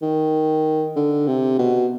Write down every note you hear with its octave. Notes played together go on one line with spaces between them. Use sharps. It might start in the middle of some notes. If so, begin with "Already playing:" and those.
D#3
D3
C3
B2